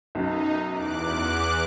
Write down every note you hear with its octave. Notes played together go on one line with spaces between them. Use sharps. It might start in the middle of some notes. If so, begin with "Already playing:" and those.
B1 F#2 D#4
E2 D6 F#6